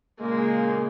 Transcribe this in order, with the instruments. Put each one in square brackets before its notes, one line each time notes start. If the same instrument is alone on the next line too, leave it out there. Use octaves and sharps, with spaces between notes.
[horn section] A#2 C#3 G#3 [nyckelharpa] A#3